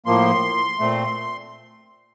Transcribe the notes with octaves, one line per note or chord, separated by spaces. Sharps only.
A2 F3 A#3 C6
A#2 A3 C4